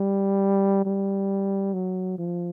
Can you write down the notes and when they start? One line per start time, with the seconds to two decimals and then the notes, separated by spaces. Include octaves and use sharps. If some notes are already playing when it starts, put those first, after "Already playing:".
Already playing: G3
0.85 G3
1.73 F#3
2.18 F3